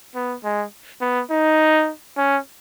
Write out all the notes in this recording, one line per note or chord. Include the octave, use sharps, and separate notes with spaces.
B3
G#3
B3
D#4
C#4